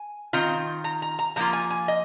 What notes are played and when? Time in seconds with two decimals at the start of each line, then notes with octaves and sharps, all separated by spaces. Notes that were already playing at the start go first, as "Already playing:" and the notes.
Already playing: G#5
0.33 D#3 C4 F4 A#5
0.84 A#5
1.02 A#5
1.19 A#5
1.36 F3 A#3 F4 A#5
1.53 G#5
1.70 G#5
1.88 D#5